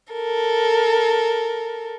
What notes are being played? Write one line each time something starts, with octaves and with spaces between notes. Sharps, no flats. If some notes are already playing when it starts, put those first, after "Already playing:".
A4 A#4